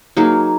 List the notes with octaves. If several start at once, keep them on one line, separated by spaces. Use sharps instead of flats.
F#3 A#3 D#4 G#4